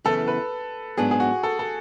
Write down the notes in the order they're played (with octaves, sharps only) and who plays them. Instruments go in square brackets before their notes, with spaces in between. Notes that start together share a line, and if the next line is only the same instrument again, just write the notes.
[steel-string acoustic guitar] F#2 C#3 E3 B3 [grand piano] A4
[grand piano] B4
[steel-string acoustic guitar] G#2 F#3 B3 D4 [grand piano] G#4
[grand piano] G#4
F#4
A4
A4